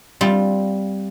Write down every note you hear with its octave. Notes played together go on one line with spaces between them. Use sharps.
G3 C4 F4